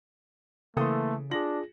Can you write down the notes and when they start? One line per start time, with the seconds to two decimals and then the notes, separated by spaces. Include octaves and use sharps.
0.77 C#3 E3 A3 A#3 A4 C6 D#6
1.31 D4 F4 G#4 A#6 F#7